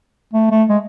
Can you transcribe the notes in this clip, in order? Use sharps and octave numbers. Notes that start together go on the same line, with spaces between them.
A3
A3
G#3